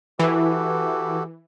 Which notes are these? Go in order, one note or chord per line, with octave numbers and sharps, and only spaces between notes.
E3 F#4 G4 A4